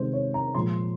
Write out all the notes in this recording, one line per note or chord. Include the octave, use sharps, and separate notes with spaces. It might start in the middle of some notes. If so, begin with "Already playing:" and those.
Already playing: C3 D#3 G#3 C5
C#5
A#5
A#2 F3 G#3 C6